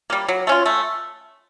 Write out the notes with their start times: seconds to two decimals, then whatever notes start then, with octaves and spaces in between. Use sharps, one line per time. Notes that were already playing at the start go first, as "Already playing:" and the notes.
0.10 G3 A#3
0.28 F#3
0.47 A3 C#4 F4
0.66 A3